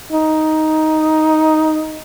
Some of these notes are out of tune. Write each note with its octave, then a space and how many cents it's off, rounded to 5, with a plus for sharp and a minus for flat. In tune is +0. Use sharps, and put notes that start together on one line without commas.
D#4 +10